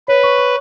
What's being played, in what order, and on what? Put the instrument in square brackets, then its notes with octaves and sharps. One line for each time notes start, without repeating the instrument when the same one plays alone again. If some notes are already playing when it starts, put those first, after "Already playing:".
[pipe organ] B4 [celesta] C#5
[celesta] C#6
C#6